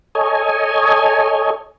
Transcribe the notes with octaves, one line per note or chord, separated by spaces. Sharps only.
A4 C#5 D#5 G#5